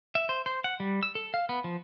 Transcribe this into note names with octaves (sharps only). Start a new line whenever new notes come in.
E5
C5
C5
F#5
G3
E6
A4
F5
B3
F3